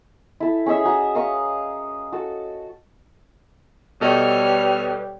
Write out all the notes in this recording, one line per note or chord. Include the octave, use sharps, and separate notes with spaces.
E4 A4
C#4 G#4 D#5 E5
F#4 F#5 A#5
D#5 F5 A#5 C#6
F#4 A4
B2 G3 A4 B4 C#5 D#5 F6